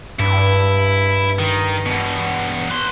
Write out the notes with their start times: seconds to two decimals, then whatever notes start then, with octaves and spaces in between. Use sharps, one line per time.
0.20 G2 E4
1.39 D#3
1.86 E2 B2
2.70 B4 C6